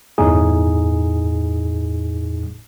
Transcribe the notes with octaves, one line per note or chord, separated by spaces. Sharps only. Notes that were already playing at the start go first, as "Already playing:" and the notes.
G1 E2 A2 D#4 G#4